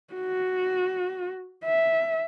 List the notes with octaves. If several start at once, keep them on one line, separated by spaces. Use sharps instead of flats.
F#4
E5